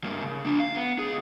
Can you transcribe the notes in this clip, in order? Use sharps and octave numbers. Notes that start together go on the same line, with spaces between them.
G2 A#3
C#3
A#3 D4
F5
B3
C#2 G#4